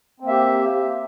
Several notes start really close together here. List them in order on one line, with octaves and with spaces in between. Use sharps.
C4 A#3 E5 G4